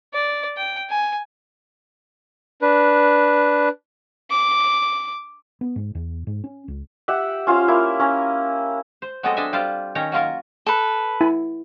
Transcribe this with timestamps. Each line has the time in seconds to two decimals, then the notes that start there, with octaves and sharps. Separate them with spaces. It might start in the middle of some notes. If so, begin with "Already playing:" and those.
0.14 D5
0.57 G5
0.90 G#5
2.62 D4 B4
4.30 D6
5.61 B3
5.76 G#2
5.95 E2
6.27 G#2
6.44 C#4
6.68 C#2
7.08 G4 E5 F#5
7.47 C#4 F4 C5 F5
7.68 A#3 E4
8.00 C#4 A#5
9.02 C5
9.23 F#3 G#3 B3 C4 A4 D#5
9.36 D4 A4 D#5 E5 G#5
9.53 G3 F4 C5 D5
9.95 D#3 C#4 C#5 G5 A#5
10.12 F#3 A#3 F4 A#4
10.66 A4 B4
11.21 E4